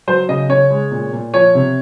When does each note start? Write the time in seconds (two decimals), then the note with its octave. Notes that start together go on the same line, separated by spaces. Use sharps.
0.08 F#3 C5
0.29 C#3 D#5
0.49 C#3 C#5
0.71 G#3
0.91 A#2
1.13 A#2
1.34 F3 C#5
1.55 C3